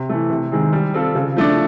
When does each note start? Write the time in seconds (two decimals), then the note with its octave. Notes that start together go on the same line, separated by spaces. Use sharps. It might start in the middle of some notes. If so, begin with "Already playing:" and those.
Already playing: C3
0.09 E3 A3
0.30 C3
0.52 D#3 G#3 C4
0.73 G3
0.94 C4 F4 A4
1.15 C#3
1.36 F3 A3 D4